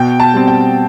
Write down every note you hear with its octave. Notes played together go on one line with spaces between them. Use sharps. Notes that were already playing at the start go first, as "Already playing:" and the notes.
Already playing: B2 G5
A5
G3 C4
G5